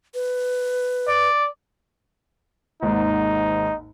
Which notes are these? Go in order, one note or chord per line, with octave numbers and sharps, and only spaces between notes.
B4
D5
G#1 D#2 G#2 D#4